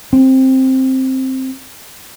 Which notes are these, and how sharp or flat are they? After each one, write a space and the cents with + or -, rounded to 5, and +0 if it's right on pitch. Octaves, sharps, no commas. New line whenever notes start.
C4 +5